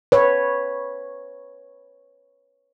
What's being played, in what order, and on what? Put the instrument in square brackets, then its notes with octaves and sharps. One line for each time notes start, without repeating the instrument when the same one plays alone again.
[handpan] B4 C#5